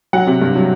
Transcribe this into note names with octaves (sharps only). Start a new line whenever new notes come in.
F#3 F#5
C3
G2
F#3